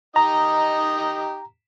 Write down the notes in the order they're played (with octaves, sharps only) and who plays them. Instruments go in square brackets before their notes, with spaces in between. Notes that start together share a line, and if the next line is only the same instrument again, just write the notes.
[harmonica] D#4 G4 D#5 [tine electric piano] A#5